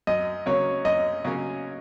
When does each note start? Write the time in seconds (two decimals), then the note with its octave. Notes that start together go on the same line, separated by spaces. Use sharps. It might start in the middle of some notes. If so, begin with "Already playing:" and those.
0.07 F#2 D#5
0.46 C#3 F#3 A#3 C#4 C#5
0.85 F#2 D#5
1.24 C#3 F#3 A#3 C#4